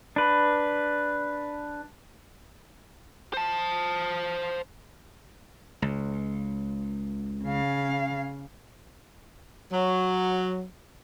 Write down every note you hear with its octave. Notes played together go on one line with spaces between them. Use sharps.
D4 B4
C5 A5
C#2
C#3 F5
F#3